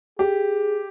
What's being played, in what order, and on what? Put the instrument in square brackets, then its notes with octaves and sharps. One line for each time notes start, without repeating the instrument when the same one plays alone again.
[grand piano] G4 [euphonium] G#4